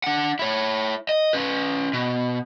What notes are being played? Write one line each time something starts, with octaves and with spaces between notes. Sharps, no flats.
D4 F#5
E4 C#5
D#5
C#4 B4
B2